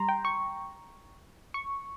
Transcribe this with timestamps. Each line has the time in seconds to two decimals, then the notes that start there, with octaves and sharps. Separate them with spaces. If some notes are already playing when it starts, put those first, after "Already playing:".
Already playing: G3 A#5 C6
0.09 G5
0.25 C#6
1.54 C#6